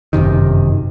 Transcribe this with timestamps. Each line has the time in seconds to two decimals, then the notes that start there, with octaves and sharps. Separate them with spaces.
0.13 G1 F#2 C3 D#3